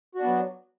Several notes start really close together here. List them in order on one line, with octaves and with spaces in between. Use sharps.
F#4 D4 B3 F#3